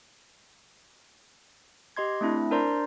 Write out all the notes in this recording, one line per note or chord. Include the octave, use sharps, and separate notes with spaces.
G4 D#5 C6 G#6
A3 C4 D4 E4
D4 A#4 C5 D5 A#5 C6